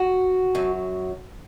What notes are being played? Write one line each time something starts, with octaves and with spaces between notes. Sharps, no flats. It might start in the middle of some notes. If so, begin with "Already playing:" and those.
Already playing: F#4
F#2 F#3